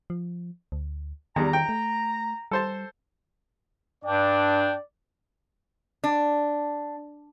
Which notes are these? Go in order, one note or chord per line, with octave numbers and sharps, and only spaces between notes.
F3
D2
E2 D#3 G3 A#5
G5
A3
G3 A4 C5 A5
G2 D4 D5 G5
D4